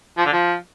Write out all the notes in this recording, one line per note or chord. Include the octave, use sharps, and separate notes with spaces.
F3
D3
F3